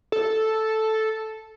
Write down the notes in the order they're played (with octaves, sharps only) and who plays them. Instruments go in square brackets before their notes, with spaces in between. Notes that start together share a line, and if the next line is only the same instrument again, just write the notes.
[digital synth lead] A4